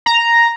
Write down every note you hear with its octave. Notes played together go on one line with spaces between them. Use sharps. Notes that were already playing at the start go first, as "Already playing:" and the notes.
A#5